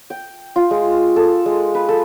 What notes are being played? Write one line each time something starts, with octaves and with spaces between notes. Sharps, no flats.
G5
F4
G#3
A4
G#3
B4
A4